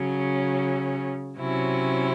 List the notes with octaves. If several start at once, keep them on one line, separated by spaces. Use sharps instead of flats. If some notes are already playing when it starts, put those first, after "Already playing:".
Already playing: C#3 F#3 C#4
C3 F#3 C#4 E4